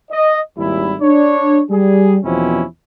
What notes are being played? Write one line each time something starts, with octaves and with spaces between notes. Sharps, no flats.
D#5
G#1 D#2 G3 E4
D4 C#5
G3 G#4
E2 B2 F3 C4 C#4 E4